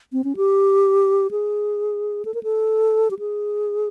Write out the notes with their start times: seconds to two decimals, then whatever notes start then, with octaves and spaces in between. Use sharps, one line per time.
0.13 C4
0.24 C#4
0.37 G4
1.31 G#4
2.25 A4
2.34 A#4
2.43 A4
3.11 G4
3.19 G#4